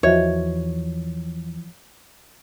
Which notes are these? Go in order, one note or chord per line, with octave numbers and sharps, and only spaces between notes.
E2 E3 F3 F#4 C#5 D#5 E5